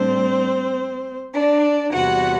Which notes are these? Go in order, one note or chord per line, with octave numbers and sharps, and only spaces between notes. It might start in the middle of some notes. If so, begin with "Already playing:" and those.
Already playing: A2 G3 C4 D4 C5
D4 D5
E2 C3 G3 F#4 F#5